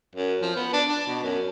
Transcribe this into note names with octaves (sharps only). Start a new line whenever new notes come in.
F#2
F3
B3
D4
D4
B2
F#2